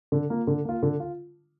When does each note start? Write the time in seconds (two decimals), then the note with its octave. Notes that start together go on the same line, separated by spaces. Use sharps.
0.12 D3
0.30 A#3 F4
0.47 D3
0.65 A#3 F4
0.83 D3
1.00 F4